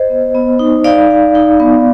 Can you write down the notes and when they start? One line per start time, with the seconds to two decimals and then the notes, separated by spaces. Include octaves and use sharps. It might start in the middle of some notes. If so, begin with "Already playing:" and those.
Already playing: C5 D#5
0.10 B3
0.35 B3
0.59 D#4
0.84 D#4 D5 F5
1.11 D#4
1.35 D#4
1.60 B3